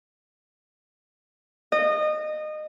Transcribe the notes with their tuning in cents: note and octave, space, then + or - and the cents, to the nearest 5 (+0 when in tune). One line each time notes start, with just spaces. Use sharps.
D#5 -25